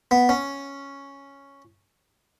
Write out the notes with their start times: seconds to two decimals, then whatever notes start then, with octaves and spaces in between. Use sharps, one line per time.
0.11 B3
0.29 C#4